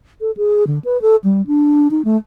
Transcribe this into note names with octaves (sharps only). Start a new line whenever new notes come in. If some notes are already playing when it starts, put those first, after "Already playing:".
A4
G#4
D3
B4
A4
G3
D4
D#4
A3